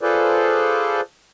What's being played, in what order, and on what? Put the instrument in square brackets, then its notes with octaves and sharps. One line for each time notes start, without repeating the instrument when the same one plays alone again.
[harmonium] F4 G#4 A4 B4 C5 D5